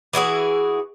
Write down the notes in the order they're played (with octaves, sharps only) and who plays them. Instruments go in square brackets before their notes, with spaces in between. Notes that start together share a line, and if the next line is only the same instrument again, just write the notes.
[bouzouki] E3 E4 F#4 G#4